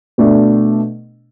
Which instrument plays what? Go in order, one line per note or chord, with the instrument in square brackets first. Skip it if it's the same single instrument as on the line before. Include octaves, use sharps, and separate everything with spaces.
[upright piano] B2 A3 D4